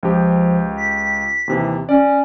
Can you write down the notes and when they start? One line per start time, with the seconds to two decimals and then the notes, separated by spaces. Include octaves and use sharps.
0.03 C#2 F3 G4
0.77 B6
1.48 D#2 C3 E3
1.89 C#4 D5